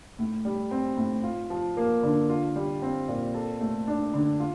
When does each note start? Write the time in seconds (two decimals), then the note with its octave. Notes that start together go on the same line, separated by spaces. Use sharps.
0.19 A2
0.45 G3
0.71 C4
0.97 A2
1.23 F4
1.50 F3
1.77 A#3
2.03 D3
2.29 F4
2.56 G3
2.82 C4
3.08 A#2
3.35 A4
3.61 A3
3.87 D4
4.14 D3
4.40 F4